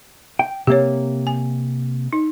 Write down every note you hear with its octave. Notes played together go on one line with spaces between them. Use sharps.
G5
C3 A#3 G4 C#5
G#5
D#4